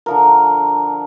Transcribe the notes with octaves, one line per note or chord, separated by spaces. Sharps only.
D3 F3 A#4